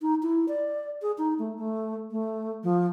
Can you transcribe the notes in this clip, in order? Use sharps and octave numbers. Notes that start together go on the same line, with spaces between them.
D#4
E4
D5
G#4
D#4
A3
A3
A3
F3